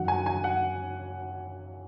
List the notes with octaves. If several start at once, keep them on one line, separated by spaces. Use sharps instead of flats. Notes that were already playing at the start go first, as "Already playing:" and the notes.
Already playing: F#2 D#3 F#3 F#5
G#5
G#5
F#5